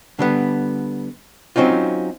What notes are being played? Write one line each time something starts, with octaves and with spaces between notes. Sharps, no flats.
D3 G3 B3
F#3 C4 C#4 D#4 F4